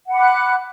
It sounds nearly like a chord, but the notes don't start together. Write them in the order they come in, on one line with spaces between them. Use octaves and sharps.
F#5 B5 D6 F#6